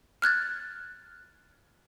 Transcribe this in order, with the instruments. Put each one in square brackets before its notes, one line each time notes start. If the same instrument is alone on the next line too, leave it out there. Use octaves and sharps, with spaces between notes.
[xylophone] F6 F#6 G#6 A6